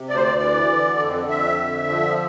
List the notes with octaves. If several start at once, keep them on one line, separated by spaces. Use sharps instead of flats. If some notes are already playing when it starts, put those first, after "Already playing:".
Already playing: C3
D2 D5
C5
D5
E3 D5
D3
F2
F2 E5
D3
F3